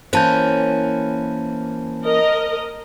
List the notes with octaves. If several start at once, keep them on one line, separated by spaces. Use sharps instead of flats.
E3 A#3 C#4 C5 A5 G6
A#4 D#5